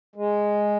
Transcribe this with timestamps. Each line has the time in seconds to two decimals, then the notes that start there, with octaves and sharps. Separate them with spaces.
0.16 G#3